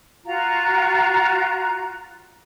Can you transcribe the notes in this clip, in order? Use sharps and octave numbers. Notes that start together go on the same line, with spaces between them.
F4 F#4 A#5